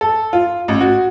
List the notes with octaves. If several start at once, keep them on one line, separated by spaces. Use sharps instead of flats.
A4
F4
A1
F#4